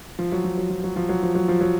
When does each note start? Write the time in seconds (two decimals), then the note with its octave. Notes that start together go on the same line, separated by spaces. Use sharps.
0.19 F3
0.32 F#3
0.44 F3
0.58 F#3
0.70 F3
0.84 F#3
0.96 F3
1.09 F#3
1.22 F3
1.35 F#3
1.48 F3
1.61 F#3